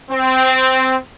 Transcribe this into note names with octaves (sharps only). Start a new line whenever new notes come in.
C4